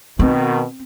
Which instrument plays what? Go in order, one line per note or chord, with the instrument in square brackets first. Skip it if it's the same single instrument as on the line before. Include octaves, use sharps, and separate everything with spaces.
[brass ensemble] B2 D#3 [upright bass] C4